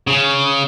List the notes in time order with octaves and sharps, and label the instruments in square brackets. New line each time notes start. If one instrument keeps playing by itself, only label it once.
[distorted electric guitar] C#3